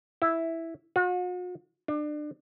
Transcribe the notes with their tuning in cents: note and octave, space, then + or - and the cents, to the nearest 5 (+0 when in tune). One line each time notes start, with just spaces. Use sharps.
E4 +0
F#4 -45
D4 +30